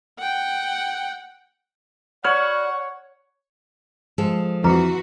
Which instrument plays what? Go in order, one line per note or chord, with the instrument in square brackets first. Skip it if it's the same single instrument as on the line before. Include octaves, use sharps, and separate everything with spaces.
[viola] F#5 G5
[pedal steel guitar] F#4 B5 F6 [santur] C#5 [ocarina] D5 [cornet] F#5
[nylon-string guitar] F3 G#3 A4
[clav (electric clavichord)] F2 [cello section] E3 F#4 [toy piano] G#4 B4 A#5